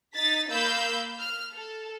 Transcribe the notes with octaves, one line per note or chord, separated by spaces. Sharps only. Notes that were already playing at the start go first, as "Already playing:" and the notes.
D#4 A6 B6
A#3 F5 B5 E6 G6
F6
A4